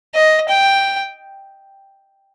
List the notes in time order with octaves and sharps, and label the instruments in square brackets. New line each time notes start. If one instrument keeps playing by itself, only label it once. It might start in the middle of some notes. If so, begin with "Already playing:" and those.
[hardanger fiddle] D#5
G5